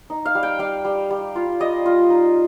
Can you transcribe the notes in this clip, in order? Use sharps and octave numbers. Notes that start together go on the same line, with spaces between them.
D#4
F5
G3
G5
G3 F5
G3
G3
F4
G3 D#5
F4
D#4